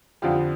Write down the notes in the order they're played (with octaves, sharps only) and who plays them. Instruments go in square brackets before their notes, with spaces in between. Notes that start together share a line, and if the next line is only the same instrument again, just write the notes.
[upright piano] F2 D3 F3 F4 G4